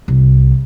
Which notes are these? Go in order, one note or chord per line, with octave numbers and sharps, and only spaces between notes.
C2